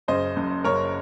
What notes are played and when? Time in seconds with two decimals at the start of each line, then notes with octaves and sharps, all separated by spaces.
0.08 F#1 F#2 C#3 C5 D#5
0.36 F#1 F#2 C#3
0.65 F#1 F#2 C#3 A#4 C#5